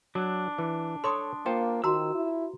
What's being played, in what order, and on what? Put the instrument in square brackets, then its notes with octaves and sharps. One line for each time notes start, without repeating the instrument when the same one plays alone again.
[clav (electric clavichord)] F#3 [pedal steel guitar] D4
[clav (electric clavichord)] E3
[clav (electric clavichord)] A4 C#5 [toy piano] C6 D6 D#6
[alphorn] A#3 [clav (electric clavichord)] F4 C5 [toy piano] G5
[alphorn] D#3 [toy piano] F#4 A#5 C6 [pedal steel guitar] E6
[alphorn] E4